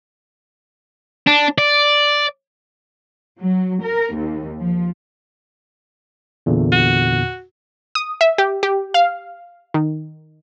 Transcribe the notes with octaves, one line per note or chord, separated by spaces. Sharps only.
D4
D5
F#3
A#4
D#2
F3
E2 A#2 D3
F#4
D#6
E5
G4
G4
F5
D#3